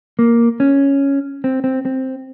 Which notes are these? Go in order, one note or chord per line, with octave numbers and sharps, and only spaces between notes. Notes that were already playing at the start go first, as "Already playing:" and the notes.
A#3
C#4
C4
C4
C4